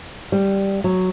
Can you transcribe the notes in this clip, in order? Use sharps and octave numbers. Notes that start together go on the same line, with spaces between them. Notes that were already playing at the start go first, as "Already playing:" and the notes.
G3
F#3